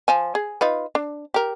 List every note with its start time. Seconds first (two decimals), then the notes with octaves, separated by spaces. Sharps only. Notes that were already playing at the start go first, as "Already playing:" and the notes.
0.08 F3 G#5
0.35 G#4
0.61 D#4 F4 B4
0.95 D4
1.34 G4 A#4